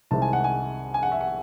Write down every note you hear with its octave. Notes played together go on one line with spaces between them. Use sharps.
C2 C3 D#3 G#3 C4 A5
G#5
F#5
G#5
G#5
F#5
E5
F#5